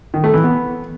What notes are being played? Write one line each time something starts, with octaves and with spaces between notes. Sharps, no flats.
D#3
A3
E3
B3